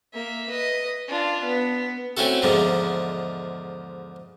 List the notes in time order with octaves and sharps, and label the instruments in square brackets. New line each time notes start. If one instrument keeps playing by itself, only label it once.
[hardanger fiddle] A#3 E5
B4 D#5
D4 F4
B3
[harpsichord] A3 C4 C#4 E4 F#4 A4
E2 G#2 D3 F3 G#3